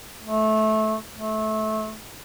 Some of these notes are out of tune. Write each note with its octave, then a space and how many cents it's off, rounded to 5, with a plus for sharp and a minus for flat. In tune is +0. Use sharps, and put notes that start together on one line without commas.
A3 -20
A3 -20